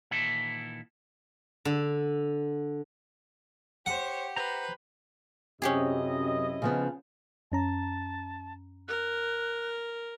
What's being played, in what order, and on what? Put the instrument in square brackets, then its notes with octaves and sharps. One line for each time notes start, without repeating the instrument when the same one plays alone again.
[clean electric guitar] A#2 D#3 E3 E4 A4
[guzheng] D3
[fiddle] G4 [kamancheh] C5 C#5 [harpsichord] F#5
[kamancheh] B4 [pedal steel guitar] C5 A#5
[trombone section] F#2 C3 [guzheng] C#4 G4 G#4 [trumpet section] E4 D#5
[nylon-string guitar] C#3 F3 B3
[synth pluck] F#2 C#4 A#5 [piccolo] A5
[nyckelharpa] A#4 [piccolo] F#6